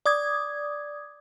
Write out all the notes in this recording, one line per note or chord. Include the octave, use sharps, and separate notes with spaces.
D5 D6 D#6 G#6